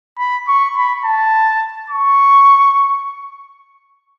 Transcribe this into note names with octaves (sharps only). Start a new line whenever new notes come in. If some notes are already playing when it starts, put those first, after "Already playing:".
B5
C#6
B5
A5
C#6